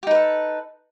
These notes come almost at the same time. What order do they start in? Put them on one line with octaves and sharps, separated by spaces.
G4 D#4 B4 A4